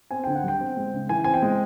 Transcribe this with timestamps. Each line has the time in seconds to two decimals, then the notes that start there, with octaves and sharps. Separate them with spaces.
0.11 C4 G#5
0.24 D3 G5
0.35 F#5
0.44 G3 G5
0.61 C4
0.77 G#3
0.94 C#3
1.09 E3 G#5
1.24 C4 G#5
1.34 G5
1.42 G#3